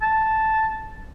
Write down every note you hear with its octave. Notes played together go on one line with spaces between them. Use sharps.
A5